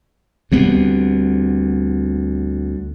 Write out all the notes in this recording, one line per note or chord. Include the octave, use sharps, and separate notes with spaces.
D2 G3 B3 C4